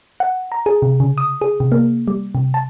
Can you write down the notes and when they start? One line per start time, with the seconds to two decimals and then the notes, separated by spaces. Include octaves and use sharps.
0.20 F#5
0.52 A#5
0.66 G#4
0.82 C3
1.00 C#3
1.18 D#6
1.41 G#4
1.60 C3
1.72 A#3
2.08 G3
2.35 C3
2.54 A5